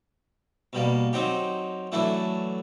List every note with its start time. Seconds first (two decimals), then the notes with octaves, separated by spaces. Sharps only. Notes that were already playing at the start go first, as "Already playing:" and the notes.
0.73 B2 G3 A#3
1.13 F#3 C4 D#4 G4
1.92 E3 F#3 A3 D4 E4